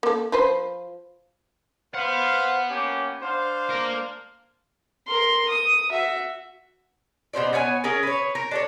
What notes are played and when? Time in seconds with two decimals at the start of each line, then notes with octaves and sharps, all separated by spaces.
0.03 A#3 A4
0.32 F3 B4 C5
1.94 B4 C5 F5 F#5 B5
2.69 A#3 C#4 G4
3.22 D4 C5 F5
3.71 A#3 A#4
5.07 A#4 C6
5.49 D#6
5.90 F#4 E5
7.33 B2 C#4 C5 D5
7.53 B3 C#5 F5 G#5
7.84 C#4 G#4 A#4
8.03 B4 C#5
8.35 A#4
8.51 D4 A4 C#5